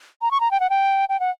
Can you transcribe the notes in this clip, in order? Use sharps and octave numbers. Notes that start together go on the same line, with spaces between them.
A#5
C#6
A#5
G5
F#5
G5
G5
F#5